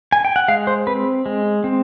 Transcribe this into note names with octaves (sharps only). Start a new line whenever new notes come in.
G#5
G5
F#5
G#3 F5
C5
C4 B4
G#3
C4